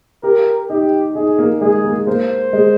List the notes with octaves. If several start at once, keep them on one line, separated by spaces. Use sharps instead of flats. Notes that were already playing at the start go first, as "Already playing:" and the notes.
G4 A#4
D#4 G4
D#4 G#4
A#3
G#3 G#4
A#3
A#3 C5
G#3